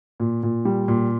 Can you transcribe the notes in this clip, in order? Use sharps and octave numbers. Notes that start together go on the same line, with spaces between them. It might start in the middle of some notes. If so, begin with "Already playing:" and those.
A#2
A#2
G3
A#2